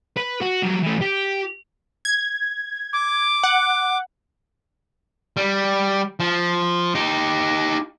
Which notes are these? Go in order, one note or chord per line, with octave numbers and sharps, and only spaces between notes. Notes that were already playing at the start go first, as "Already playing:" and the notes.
B4
F#4
F#3 G3
E3 A3
G4
G#6
D6
F#5
G3
F3
D#4 G4